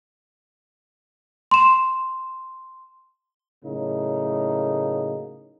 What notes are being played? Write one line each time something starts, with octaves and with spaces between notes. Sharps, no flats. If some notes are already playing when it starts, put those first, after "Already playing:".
C6 E7
A2 C#3 F#3 A#3 D#4